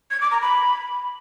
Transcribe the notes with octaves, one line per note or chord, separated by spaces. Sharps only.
G#6
D6
A#5
B5